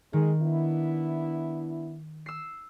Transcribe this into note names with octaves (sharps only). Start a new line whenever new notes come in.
D#3 G#3
B3 D4 E4
E6 C7